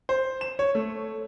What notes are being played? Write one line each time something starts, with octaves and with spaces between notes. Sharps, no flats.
C5
E7
C#5
A3